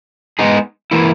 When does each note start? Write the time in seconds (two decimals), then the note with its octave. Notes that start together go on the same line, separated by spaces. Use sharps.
0.39 G#3 B3 D#4 G#4
0.91 E3 A#3 E4